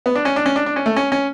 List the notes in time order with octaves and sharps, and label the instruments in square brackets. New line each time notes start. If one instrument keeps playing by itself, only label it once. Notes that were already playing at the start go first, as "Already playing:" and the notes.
[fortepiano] B3
D4
C#4
D4
C#4
D4
D4
C#4
A3
C#4
C#4